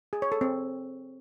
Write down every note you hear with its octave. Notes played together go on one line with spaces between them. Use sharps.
G#4
C#5
A4
C4